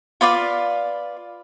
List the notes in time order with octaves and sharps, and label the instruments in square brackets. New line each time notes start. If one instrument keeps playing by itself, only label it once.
[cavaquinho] F4 B4 D5 F5